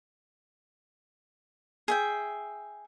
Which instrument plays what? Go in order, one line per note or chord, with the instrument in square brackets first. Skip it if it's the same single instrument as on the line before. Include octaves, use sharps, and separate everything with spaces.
[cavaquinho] G#4 E5 G5